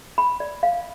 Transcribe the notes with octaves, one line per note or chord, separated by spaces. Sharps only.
B5
D5
F5